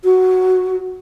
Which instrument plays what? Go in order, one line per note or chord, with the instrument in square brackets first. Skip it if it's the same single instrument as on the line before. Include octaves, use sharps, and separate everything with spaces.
[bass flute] F#4